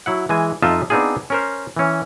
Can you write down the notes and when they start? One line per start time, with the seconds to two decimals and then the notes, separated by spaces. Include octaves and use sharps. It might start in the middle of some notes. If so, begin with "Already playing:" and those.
0.06 F#3 E4 F#5
0.29 E3 G#3 G#5
0.62 F2 D#4 F4 D#5 E5 A5
0.90 B3 C4 D4 D#4 F4 G#4
1.30 C#4 A#4 C5
1.77 E3 C#4